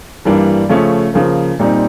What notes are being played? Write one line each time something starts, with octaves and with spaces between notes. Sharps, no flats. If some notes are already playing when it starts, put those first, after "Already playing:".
G2 E3 G3 A#3 D4
C#3 F3 A3 C#4
C#3 F3 A#3
A#2 G3 C4 D#4